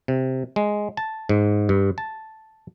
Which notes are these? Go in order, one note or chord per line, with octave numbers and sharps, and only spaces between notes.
C3
G#3
A5
G#2
G2
A5